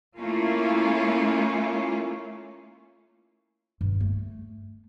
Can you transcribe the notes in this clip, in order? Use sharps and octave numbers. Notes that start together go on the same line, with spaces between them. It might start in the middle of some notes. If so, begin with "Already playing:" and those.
A3 A#3 C#4 E4 F4
G2
A3